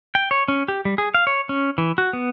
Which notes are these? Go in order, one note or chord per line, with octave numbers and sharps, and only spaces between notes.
G5
C#5
C#4
G4
G3
G#4
F5
C#5
C#4
E3
F#4
B3